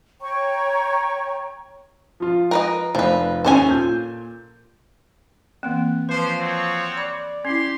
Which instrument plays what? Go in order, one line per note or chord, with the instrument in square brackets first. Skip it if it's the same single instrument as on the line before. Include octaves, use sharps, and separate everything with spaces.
[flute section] C#5 G5 A#5 C#6
[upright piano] F3 F4
[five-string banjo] A#4 B4 D#5
[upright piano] F1 [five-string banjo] F3 B4
[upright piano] D#2 C#4 A5 [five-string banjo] A4 C5 G#5
[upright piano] A#2 G6
[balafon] E3 A#3 C4
[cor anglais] F3 [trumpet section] C#4 D4 C5 [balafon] B4
[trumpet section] C4 F#4 C#5
[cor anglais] D5 [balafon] B5
[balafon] C#4 E4 [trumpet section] G4 C6